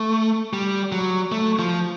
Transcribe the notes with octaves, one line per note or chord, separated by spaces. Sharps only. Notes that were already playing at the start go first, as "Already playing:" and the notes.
Already playing: A3
G3
F#3
A3
F3